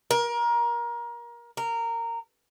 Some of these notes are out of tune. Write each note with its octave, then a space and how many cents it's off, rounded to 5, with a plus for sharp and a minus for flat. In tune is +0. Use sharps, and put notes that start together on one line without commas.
A#4 +25
A#4 -15